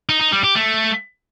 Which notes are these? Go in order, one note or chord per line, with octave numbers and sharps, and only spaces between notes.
D#4
D#4
G3
G4
A3